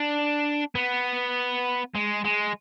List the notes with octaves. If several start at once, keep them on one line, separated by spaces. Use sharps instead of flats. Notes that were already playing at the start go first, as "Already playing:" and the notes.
Already playing: D4
B3
G#3
G#3